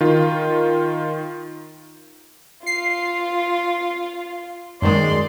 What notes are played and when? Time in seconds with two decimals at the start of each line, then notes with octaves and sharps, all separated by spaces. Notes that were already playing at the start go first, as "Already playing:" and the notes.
0.01 D#3 F4
2.66 F4 C7
4.82 F#2 D#3 G#3 D5 C6